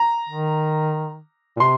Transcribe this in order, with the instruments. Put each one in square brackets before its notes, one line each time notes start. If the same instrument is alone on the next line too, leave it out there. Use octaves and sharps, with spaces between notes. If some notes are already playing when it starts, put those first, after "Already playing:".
Already playing: [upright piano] A#5
[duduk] D#3
A#2
[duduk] C3 [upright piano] C6